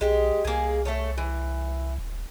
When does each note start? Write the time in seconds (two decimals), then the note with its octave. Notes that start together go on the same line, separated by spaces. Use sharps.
0.01 B1 G#3 G4
0.45 C2 A#3 G#4
0.85 A3 A4 C#5
1.18 E3
1.98 D#1